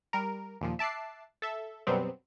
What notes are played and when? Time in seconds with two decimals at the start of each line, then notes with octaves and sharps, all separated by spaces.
0.13 G3 A#4
0.61 D#2 A#2 F3
0.79 E5 A5 D6 F#6 C7
1.42 A4 E5
1.87 F#2 B2 F#3 G3 B3 C4